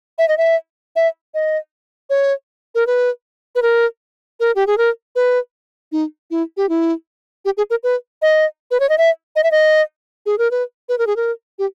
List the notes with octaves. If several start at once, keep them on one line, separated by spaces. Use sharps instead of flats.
E5
D#5
E5
E5
D#5
C#5
A#4
B4
B4
A#4
A#4
G4
G#4
A#4
B4
D#4
E4
G4
E4
G4
G#4
A#4
B4
D#5
B4
C#5
D#5
E5
D#5
E5
D#5
G#4
A#4
B4
B4
A#4
G#4
A#4
G4